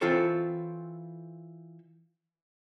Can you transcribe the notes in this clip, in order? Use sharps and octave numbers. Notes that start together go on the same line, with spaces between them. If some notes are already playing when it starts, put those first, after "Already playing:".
E3 C4 F4 A4 C#5